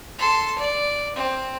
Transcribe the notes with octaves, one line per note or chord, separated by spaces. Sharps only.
A4 C6
D5
C4